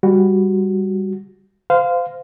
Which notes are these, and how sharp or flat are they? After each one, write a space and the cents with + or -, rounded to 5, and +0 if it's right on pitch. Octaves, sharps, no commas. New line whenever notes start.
G3 +10 F#4 +0
C5 -30 F5 +0